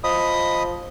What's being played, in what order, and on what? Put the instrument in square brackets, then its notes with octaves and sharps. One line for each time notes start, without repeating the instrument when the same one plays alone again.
[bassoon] F3 [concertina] D#5 B5 D#6